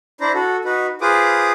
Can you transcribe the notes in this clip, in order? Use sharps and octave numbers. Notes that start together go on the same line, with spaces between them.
D4 E4 C5 A#5
F#4 A4
D#4 F#4 B4
F4 G#4 B4 C5 D6 D#6